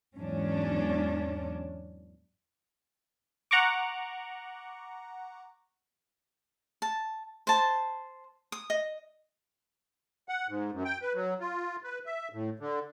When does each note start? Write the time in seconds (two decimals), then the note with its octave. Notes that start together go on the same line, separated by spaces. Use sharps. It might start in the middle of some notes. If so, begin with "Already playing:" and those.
0.18 E2 G#2 F#3 C#4 D4
3.51 F#5 A#5 C#6 D6
6.82 A5
7.47 C5 A5
8.52 D#6
8.70 D#5
10.29 F#5
10.49 G#2
10.72 F#2
10.84 G5
11.02 B4
11.14 F#3
11.40 F4
11.84 B4
12.06 E5
12.33 A2
12.59 D3